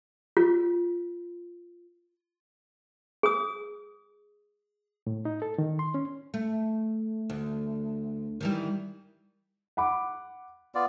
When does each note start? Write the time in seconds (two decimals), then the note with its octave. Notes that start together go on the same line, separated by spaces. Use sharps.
0.37 F4
3.23 G#4 D#6
5.07 A2
5.25 D#4
5.42 A4
5.58 D#3
5.79 C6
5.94 C#4
6.34 A3
7.30 D2
8.41 D#3 E3 G3
9.77 F#5 B5 D6
10.75 B3 F4 D5